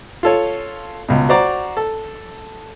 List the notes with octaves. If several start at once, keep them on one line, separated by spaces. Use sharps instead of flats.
F4 A4 C#5
C#2 B2
F#4 C5 D5 A#5 D6
A4